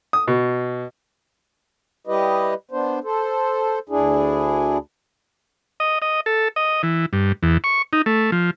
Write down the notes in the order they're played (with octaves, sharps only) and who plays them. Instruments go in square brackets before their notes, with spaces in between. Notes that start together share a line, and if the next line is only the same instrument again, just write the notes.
[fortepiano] D#6
B2
[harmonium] G3 E4 G4 B4 D#5
B3 D4 C5
A4 C5
D2 D4 E4 G#4
[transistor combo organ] D#5
D#5
A4
D#5
E3
G2
E2
C#6
D#4
A3
F3